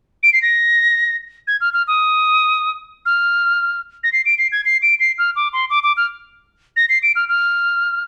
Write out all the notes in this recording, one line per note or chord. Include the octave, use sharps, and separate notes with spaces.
D7
C7
A#6
G#6
F6
F6
D#6
F6
A#6
C7
D7
C7
G#6
C7
D7
C7
F6
D6
C6
D6
D6
F6
A#6
C7
D7
F6
F6